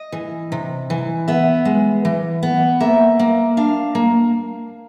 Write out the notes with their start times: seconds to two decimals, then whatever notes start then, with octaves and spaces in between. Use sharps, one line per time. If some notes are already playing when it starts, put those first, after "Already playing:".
Already playing: D#5
0.12 E3
0.52 C3
0.90 E3
1.28 B3 E5
1.65 G#3
2.05 E3
2.43 B3
2.80 A#3 E5
3.19 A#3
3.57 D4 F5
3.95 A#3